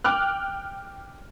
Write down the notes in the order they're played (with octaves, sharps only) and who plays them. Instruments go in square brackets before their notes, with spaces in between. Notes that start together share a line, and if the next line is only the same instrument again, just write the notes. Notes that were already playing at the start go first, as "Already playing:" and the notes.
[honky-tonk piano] G5 D6 F6 F#6